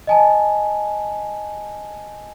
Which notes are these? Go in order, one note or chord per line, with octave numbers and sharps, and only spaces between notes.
D#5 G#5 A5